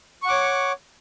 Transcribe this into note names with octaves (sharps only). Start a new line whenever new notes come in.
C#5 F#5 C#6 D6